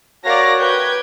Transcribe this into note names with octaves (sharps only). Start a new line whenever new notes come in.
F#4 A#4 C#5 D5 F5 A#6
B4 G5 G6 G#6